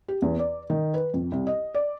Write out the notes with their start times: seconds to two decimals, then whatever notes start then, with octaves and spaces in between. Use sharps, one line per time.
0.08 G4
0.22 E2
0.39 D5
0.70 D#3
0.94 B4
1.14 F2
1.32 C2
1.47 D#5
1.75 D5